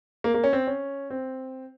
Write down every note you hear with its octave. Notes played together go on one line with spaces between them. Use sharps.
A#3
A#3
C#4
C4
C#4
C4